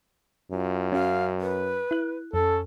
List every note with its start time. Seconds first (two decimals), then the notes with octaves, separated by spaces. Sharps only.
0.52 F#2 F4
0.92 C#4 F#4 F5
1.41 B4
1.91 E4 F#6
2.33 F2 C#4 A4